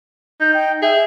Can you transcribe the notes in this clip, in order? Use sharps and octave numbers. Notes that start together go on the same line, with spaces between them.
D#4 G6
G5
G#4 E5